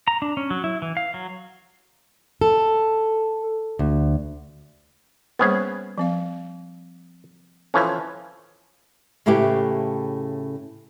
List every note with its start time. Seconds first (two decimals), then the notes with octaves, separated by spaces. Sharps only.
0.08 A#5
0.22 D4
0.37 C#4
0.50 F#3
0.64 E4
0.82 E3
0.97 F5
1.14 F#3
2.41 A4
3.79 D2
5.39 G3 A#3 B3 C#4 G#4 C5
5.98 F3 C4 F5
7.74 E3 F3 C#4 A4 C#5 A5
9.26 A2 C#3 A3 E4 G4 B4